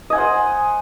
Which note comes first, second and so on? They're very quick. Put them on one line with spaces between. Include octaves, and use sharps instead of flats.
D#5 G#5 F#5 C5